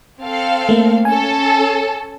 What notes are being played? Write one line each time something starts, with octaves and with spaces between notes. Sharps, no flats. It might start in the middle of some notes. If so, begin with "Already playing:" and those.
C4 A4 F5
A3 A#3
C#4 A4 G#5